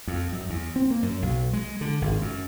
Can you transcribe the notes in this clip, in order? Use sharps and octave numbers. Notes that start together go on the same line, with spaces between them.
F2
F#2
E2
C4
A#3
F#2
B1
G#3
D3
G#1
F#2